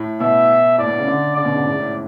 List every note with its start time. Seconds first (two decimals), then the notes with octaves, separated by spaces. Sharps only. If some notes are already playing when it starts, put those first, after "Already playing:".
Already playing: A2
0.20 B2 E5
0.78 A2 D5
0.88 B2
0.98 C#3
1.07 D3
1.36 C#3 D5
1.45 B2
1.55 G#2
1.65 A2
1.72 G#2
1.80 A2